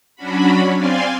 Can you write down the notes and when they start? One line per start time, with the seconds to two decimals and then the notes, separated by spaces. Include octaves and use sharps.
0.16 F#3 C#4 D4 F#4 B5
0.74 C4 D5 F5 G#5 C6